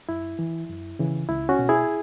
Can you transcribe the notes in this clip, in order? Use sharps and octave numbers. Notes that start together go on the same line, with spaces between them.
F#2 E4
E3
F#2
C#3 E3
C#2 E4
C#4 F#4
B2
E4 G#4